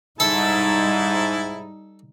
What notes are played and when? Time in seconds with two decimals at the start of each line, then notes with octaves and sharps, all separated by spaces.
0.20 G#2 G3 D#4 E4 A4 A5